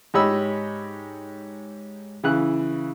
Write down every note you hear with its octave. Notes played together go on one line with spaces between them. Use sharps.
G#2 G4 C#5 D#5 B5 E6
C#3 E3 F#6